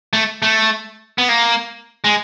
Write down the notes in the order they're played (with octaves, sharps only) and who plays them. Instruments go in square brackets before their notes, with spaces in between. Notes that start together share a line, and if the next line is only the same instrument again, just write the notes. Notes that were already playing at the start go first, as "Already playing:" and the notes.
[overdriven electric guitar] A3
A3
B3
A#3
G#3